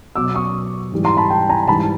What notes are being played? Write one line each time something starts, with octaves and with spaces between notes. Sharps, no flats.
B2 F#3 D6 E6
C#6 D#6
G#2 E3 G3
A#5 C6
A5 B5
G5 A5
G#5 A#5
G#2 E3 G3 A5 B5